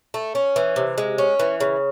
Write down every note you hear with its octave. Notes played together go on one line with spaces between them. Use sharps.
A3
C#4
E3
C3
G#3
C#4
E3
C#3